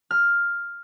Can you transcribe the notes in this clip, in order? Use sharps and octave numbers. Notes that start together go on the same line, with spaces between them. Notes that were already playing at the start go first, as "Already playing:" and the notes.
F6